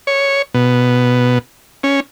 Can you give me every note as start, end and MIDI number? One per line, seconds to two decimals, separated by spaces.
0.07 0.42 73
0.54 1.38 47
1.83 2.00 61